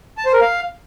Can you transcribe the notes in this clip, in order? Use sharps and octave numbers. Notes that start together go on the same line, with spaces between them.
A5
C5
A#4
F5